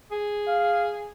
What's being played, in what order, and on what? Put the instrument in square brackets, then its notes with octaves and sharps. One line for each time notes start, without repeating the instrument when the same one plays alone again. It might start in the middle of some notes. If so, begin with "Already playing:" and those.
[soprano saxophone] G#4
[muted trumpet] F5